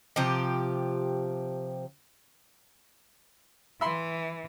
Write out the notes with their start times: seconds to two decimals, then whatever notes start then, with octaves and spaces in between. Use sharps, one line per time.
0.16 C3 F3 G4
3.81 E3 E5 B5 C6